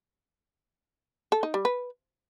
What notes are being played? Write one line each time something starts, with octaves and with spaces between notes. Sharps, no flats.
A4
D#4
G3
B4